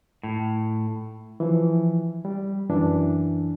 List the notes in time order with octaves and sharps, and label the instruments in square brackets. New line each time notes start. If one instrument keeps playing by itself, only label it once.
[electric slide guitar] A2
[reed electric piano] E3 F3
G3
F#2 E3 D4